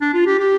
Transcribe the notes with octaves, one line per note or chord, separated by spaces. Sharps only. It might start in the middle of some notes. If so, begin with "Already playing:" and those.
D4
F4
G4
G4